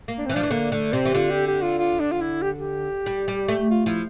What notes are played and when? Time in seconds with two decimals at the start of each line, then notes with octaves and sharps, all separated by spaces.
0.08 A#3
0.18 D4
0.25 C4
0.30 E3
0.34 F3 D4
0.43 E3
0.51 D3 A#3
0.72 D3 A3
0.93 C3 C4
1.05 E3
1.14 D3 F4
1.30 G4
1.47 G4
1.62 F4
1.78 F4
2.00 D4
2.12 F4
2.22 E4
2.42 G4
2.58 G4
3.06 G3
3.28 G3
3.48 A3
3.70 F4
3.86 F3 E4